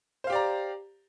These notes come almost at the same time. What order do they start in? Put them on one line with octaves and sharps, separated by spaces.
C5 F5 G4 D5 A#5